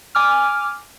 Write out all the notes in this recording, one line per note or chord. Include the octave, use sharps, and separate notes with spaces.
G#5 D6 F6